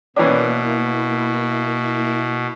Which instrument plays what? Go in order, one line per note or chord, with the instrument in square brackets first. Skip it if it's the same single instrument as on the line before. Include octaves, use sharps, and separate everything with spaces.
[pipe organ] B2 [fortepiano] E3 C#4 D4 [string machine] A#3 E4